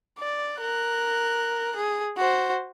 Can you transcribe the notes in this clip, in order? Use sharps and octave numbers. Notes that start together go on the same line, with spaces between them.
D5
A#4 F#6
G#4
F#4 C5